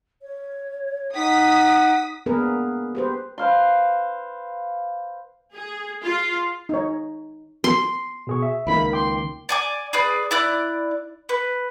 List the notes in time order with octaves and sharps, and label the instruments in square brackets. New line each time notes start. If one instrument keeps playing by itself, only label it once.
[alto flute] C#5
[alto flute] D#4 [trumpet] F#5 [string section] D#6 B6
[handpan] A#3 B3 D4 G#4 A#4 B4
G4 B4 C5
[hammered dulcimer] B4 C5 F5 C6
[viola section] G#4
F4
[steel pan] D#4 C#5
[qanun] C6
[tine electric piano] B2 G#4 C#6
E5
[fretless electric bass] C#2 D#3 A#3 [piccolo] B5
[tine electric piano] G5 D6 [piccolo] C6
[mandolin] D5 G#5 D6
G#4 B4 D5
E4 D5 F#6
B4